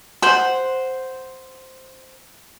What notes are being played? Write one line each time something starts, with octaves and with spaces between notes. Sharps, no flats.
C5 F#5